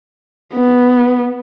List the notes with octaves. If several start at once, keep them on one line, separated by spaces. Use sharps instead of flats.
B3